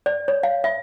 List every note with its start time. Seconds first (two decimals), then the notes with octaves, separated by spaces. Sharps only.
0.06 D5
0.28 C#5
0.43 F5
0.64 E5